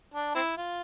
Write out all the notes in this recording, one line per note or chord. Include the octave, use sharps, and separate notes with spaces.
D4
C4 E4
F4